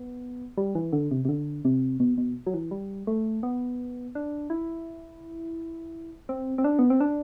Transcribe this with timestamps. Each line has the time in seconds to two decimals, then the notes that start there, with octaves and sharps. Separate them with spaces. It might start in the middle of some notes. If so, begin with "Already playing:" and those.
Already playing: B3
0.57 G3
0.75 E3
0.93 D3
1.11 C3
1.25 C3
1.29 D3
1.65 C3
2.00 B2
2.18 B2
2.47 F#3
2.54 E3
2.71 G3
3.07 A3
3.43 B3
4.15 D4
4.50 E4
6.29 C4
6.58 C4
6.64 D4
6.79 B3
6.90 C4
7.00 D4